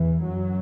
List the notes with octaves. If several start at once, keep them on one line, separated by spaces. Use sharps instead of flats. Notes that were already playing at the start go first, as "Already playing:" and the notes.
Already playing: E2 E3
F#2 F#3